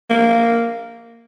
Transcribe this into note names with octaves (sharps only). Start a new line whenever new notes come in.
A#3